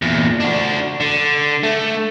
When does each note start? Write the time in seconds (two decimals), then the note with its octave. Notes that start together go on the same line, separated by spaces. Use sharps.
0.02 E2 A#2
0.40 D4 F#4
1.00 D3
1.63 A3